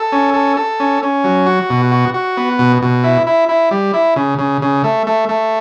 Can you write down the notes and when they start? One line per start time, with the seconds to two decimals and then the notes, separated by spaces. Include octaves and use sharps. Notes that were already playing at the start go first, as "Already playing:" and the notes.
Already playing: A4
0.12 C#4
0.34 A4
0.57 A4
0.80 C#4
1.03 C#4
1.24 F#3
1.46 F#4
1.70 B2
1.92 F#4
2.14 F#4
2.37 B3
2.59 B2
2.82 B2
3.04 E4
3.27 E4
3.49 E4
3.71 G3
3.94 E4
4.16 C#3
4.38 C#3
4.62 C#3
4.84 A3
5.07 A3
5.29 A3